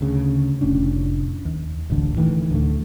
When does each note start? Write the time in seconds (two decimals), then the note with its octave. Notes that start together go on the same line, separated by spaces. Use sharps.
0.01 D2 C#3
0.61 F1 A2 C#4 D4
1.45 D#2
1.90 D1 A1 D3
2.17 A2 D#3 E3
2.50 D2 D3 A3